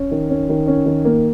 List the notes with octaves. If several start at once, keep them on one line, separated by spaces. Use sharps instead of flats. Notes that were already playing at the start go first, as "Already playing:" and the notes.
Already playing: C#4
D#3
C#4
D#3
C#4
D#3
A#3